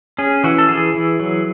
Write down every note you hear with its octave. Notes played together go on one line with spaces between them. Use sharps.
C#4 G#4
E3 F#4
A4
E3 G#4
E3
F#3